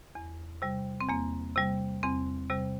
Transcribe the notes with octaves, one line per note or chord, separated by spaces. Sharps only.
E2
C3 G3
C4
E2 A#3
C3 G3
E2 C4
C3 G3